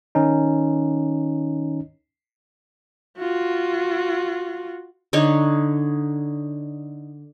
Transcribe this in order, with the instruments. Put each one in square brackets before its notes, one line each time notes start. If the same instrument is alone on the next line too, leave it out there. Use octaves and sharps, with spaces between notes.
[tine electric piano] D#3 C#4 D#4
[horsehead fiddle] F4 F#4
[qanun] D3 D#4 C#5 C#6